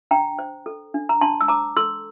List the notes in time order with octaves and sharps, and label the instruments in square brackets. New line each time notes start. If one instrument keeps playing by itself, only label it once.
[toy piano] D4 G5 A#5
C5
A4
D4
A#5
D4 A5 C6
E6
C5 A#5 D6
A4 C6 E6